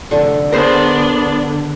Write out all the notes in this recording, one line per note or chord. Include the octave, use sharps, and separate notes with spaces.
F1 D3 A4
D3 B3 D4 G#4 A#4 C5 G#5